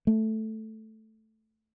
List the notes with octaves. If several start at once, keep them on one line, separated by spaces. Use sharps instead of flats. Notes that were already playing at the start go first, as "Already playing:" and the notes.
A3